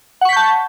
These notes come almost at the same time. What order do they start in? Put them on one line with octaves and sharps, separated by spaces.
F#5 C#6 B6 G6 A5